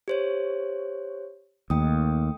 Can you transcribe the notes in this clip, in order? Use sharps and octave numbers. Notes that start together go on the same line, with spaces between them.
G4 C5 C#5
D#2 A3 G5 D#6